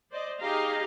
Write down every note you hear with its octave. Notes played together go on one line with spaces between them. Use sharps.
C5 D5 D#5
D#4 G4 G#4 D#5 F5 A#5